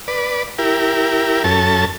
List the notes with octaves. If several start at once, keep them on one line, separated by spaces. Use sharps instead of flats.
B4 D5
E4 G4 A#4
F#2 C#4 A4 A5